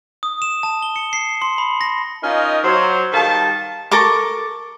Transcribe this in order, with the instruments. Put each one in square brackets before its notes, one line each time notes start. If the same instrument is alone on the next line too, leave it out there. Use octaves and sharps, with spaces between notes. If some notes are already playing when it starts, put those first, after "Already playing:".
[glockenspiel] D#6
E7
A5
G7
C#7
C7
C6
B5
A#6
[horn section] C#4 D#4 F4 A#4 D#5
F#3 C5
D#3 G3 F5 A5
[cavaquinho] A4 A#4 C#6 D6